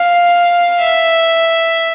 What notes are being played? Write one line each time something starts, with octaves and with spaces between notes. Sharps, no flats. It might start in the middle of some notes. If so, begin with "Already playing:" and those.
Already playing: F5
E5